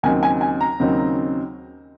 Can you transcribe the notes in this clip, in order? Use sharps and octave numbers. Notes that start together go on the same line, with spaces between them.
D#2 C#3 F#3 C4 D#4 G#5
G#5
G#5
A#5
D#2 C#3 F#3 C4 D#4